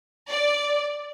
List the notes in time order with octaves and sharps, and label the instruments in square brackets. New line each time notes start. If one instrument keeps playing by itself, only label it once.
[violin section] D5